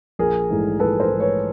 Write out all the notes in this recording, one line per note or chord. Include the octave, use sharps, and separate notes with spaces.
A#1 G#4 A#4
G#2 E3 A3
A#1 A4 B4
A#4 C5
G#2 E3 A3
B4 C#5